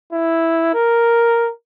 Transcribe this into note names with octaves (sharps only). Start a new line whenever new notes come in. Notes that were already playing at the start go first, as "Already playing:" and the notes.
E4
A#4